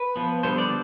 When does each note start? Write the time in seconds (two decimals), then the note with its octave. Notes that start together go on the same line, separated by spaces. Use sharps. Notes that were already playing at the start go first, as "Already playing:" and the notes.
Already playing: B4
0.16 F3 B3
0.43 D3 G3 B3 C5
0.58 D5